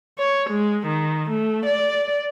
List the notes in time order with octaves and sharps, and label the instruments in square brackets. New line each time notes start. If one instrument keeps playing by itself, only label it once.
[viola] C#5
G#3
D#3
A3
D5